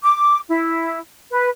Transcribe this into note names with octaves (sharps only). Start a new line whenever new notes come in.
D6
E4
B4